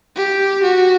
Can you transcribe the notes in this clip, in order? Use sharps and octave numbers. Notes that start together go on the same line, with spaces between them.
G4
F#4